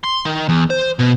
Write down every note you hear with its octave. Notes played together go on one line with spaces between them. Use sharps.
C6
D#3
E2
C5
B2